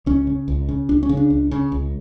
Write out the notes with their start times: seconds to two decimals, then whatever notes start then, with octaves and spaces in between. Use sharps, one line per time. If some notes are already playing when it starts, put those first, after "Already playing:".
0.06 C#2 C#4
0.27 C#3
0.48 C#2
0.69 C#3
0.89 C#2 D4
1.03 C#4
1.09 C#3
1.17 D4
1.30 C#2
1.51 C#3
1.72 C#2